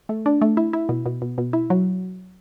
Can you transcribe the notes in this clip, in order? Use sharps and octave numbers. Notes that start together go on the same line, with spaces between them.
A3
D4
A3
E4
E4
B2
B2
B2
B2
E4
F#3